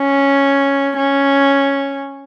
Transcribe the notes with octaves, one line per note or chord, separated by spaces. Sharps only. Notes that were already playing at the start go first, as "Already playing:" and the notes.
Already playing: C#4
C#4